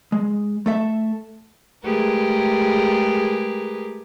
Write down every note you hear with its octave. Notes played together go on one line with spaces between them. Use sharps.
G#3
A3 A4 E5
G#3 A3 G4 G#4 A#4 B4